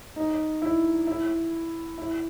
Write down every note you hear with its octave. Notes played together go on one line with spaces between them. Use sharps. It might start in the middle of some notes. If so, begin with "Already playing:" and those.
D#4
E4
E4
E4